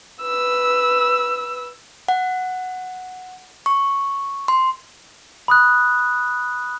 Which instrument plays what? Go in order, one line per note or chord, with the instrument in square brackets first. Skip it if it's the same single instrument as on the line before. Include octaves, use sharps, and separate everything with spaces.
[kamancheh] B4 E6
[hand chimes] F#5
C#6
C6
[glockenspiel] B5 D#6 F#6